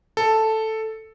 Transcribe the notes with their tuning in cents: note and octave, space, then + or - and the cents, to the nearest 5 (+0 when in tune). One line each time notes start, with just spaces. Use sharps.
A4 +0